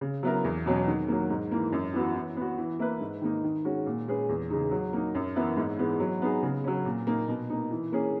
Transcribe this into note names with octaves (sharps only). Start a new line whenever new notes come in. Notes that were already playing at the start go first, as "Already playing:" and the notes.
C#3
F#3 B3 E4 A#4
E2
B2 F#3 C#4
D#3
F#3 A#3
G#2
E3 A#3
F#2
E3 B3 F#4
E3
B3 F#4
E3
A#3 E4 B4
G#2
D#3 A#3 D#4
D#3
G#3 C#4 F#4
A#2
G#3 C#4 G#4 B4
E2
C#3 G#3 D#4
F#3
A#3 D#4
F#2
E3 B3 E4 A#4
G#2
E3 G#3 B3
F#3
B3 D#4 G#4
C#3
F#3 C#4
A#2
A#3 D#4
B2
A#3 D#4
E3
A#3 C#4 G#4